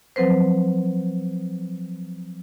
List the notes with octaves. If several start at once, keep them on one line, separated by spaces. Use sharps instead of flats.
F3 F#3 C4 B4 C5